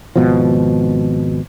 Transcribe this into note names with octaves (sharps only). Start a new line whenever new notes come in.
G#1 B2 F3